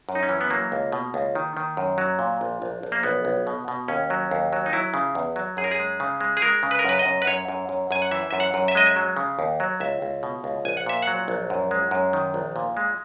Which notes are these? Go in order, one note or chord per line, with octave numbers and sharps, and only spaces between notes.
F#2
D#4
C#4
E3
B3
F#3 A#3
C#2
B2
C#2
D#3
D#3
F#2
F#3
A#2
A#1
A#1
A#1
A#3
B1 B3
B1
B2
B2
D#2 C#4
F#3
D#2
F#3
D#4
F#3 E4
C#3
E2
F#3
F#2 G#4
A#4
G#4
G#3
C#3
G#3
G#4
G#3 A#4
C#3
B4
A#4
F#2 B4
D#5
F#2
B4
F#2 C#5
F#2
F#2
F#2 G#5
F#5
E3 E5
F#2 E5
F#5
F#2
E5
G#3 D#5
E5
F#3
C#3
D#2
F#3
C#2 E5
C#2
B2
C#2
A#1 G#5
F#5
A#2 E5
F#3 F#5
A#1
F#2
G#3
F#2
D#3
A#1
A#2
G#3